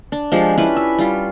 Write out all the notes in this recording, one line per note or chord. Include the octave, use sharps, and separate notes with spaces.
D4
F3 G#3 D4 G4
C#4 D4 E4 B4
E5
G3 F4